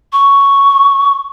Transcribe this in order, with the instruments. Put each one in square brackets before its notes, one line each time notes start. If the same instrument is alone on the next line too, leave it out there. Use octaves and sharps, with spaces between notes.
[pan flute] C#6